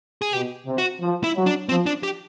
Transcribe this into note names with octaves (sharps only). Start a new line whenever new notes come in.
G#4
B2 G4
C3
F#4
F3
E4
F#3
D4
F3 C4
D4
G4